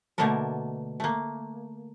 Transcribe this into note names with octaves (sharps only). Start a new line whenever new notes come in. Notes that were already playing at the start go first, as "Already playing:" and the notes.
B2 D3 A3 A#3 A4 A#4
A3 A#3